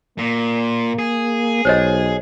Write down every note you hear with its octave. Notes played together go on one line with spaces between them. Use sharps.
A#2 A#3
G#4
B1 C5 C#5 D#5